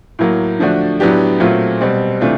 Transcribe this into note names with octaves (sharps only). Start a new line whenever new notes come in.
A2 F#3 A#3
D3 F3 A3 D4 F#4
A2 F#3 B3 D4 G4
A#2 F#3 A3 C4 F4
B2 G3 C4
C3 E3 A3 D4 F4